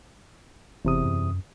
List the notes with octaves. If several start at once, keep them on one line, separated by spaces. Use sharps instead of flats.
F#1 E2 C3 D#6
F#2